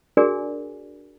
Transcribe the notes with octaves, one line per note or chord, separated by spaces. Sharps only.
D4 F#4 G#4 A#4 D5 G#5